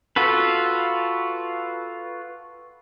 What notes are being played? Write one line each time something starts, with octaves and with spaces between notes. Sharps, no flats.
F4 F#4 A4 B4